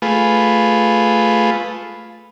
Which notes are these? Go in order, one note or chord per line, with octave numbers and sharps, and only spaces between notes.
A3 F4 G#4 B4